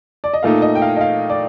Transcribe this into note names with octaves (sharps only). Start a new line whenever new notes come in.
D5
D#5
A#2 A3 D#4 F5
D#5
G5
F5
D#5
F5
D5